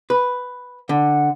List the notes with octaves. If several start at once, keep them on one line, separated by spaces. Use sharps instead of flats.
B4
D3 F#5